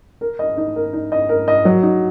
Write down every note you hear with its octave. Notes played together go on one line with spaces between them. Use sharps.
A#4
D#5
D#4
A#4
D#4
D#5
A#4
D#5
F#3
D#4